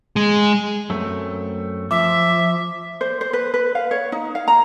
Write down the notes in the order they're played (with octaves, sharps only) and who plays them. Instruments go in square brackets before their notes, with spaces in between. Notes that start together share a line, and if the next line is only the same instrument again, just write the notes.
[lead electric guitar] G#3
[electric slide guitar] F#2 A3 C4
[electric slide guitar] F3 [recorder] E5 [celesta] D6
[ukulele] C5
C5
B4
B4
F5
C#5
D#4
F5
A#5